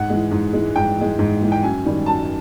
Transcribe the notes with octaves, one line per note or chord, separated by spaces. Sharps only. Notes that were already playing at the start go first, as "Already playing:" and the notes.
Already playing: G#2 F#5
E3 G#3
G#2
E3 G#3
G#2 G5
E3 G#3
G#2
E3 G#3
G5
F#2 G#5
D#3 G3
F#2 A5